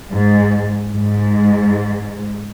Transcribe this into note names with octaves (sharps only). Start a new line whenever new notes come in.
G#2
G#2